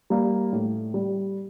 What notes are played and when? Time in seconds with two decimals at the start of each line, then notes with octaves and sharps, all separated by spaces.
0.10 G3 A#3
0.52 A2
0.94 G3